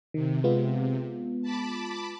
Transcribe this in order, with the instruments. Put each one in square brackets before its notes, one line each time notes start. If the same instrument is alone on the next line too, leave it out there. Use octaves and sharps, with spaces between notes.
[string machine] C3 [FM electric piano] D#3
[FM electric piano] G#3 B3 F4
[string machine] A5 B5 D6